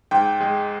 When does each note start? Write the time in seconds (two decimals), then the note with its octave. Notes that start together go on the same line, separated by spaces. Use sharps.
0.11 G#2 G5
0.40 G#3